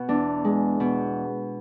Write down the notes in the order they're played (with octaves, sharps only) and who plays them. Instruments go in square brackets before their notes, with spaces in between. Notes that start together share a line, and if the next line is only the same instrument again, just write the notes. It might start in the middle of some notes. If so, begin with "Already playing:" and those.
Already playing: [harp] B2 B3
E2 D4
G#3
B2